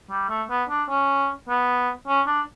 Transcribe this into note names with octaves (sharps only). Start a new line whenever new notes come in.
G3
A3
B3
D4
C#4
B3
C#4
D4